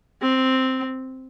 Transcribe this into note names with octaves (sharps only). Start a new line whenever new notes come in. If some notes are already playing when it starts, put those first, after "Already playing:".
C4